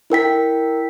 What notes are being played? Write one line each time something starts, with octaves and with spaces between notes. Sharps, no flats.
E4 A#4 G5 B6